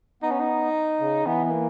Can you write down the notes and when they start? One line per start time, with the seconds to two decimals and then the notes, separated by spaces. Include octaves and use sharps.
0.23 B3 D#4
0.31 C#4
0.40 D#4
1.00 C#3
1.26 E3 B3
1.45 B3
1.51 A#3